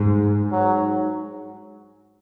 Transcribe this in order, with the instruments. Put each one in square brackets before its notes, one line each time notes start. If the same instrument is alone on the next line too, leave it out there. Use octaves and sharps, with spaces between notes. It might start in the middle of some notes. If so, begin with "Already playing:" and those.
Already playing: [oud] G#2
[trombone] F#3